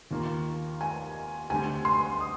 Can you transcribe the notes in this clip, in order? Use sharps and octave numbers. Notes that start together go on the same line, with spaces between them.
D#2 D#3 A#3 F4 A#4
G#5
D2 D3 G3 C4 G#5
C6
D#6